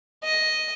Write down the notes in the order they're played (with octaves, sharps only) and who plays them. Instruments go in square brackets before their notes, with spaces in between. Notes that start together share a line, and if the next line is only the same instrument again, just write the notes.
[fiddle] D#5